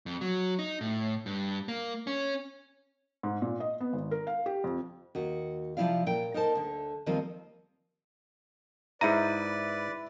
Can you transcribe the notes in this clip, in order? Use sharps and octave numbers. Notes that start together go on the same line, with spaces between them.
F2
F#3
D#4
A2
G2
A#3
C#4
G#2
A#2
D#5
B3
G#1
A#4
F5
G4
F2
D#2 F#4
C3 F3 C#4 E4 D5 F5
A#2 G5
D#4 A#4 C5 A5
D2 D3
D#2 D#3 F3 G3 C4 D#5
G#2 E4 B4 D5 A#5 D#7